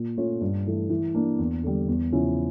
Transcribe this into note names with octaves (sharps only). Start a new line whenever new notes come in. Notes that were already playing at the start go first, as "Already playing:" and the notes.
Already playing: A#2
A3 C#4 F4 C#5
G2
E3 A3
E3
A#3 D4
E2
D3 G3
E2
C#3 F3 C#4 E4